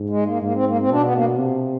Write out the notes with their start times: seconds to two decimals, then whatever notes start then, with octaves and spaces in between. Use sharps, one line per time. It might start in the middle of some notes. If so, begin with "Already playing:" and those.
Already playing: G#2
0.09 G#3
0.26 A#3
0.42 G#2 A#3
0.54 C4
0.67 A#3
0.79 C4
0.91 B2 D4
1.03 B3
1.15 A#3
1.39 C3